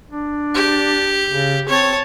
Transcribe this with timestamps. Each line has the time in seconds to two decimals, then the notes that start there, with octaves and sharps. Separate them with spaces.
0.10 D4
0.55 G4
1.28 C#3
1.69 C4 C#5 A5